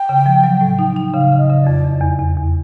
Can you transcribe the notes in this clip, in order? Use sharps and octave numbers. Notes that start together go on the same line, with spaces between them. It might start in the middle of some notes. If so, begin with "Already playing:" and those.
Already playing: G5
C#3
F3
F#3
A2
D#4
D#4
C#3 F5
C#3
D#5
C#3
D5
F2
E2
E2
E2
E2